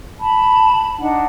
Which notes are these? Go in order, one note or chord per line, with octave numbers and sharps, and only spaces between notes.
A5 B5
D4 D#4 F#5